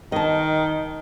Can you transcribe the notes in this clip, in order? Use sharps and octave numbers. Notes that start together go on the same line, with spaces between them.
D#3 D#5 A5